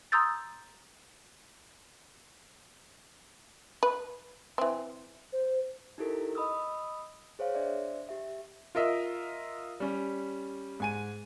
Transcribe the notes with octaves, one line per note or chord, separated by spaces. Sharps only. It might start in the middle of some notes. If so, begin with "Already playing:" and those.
A#5 C6 D#6 E6 G6 A6
B4
E3 C4
C5
D#4 E4 G4 A4 A#4
D#5 B5 D#6 E6
G#4 C5 C#5 F5
D4 C5 D5 E5
G4 E5
F4 A#4 D#5 E5
G3 C#4
G#2 G#5 D#7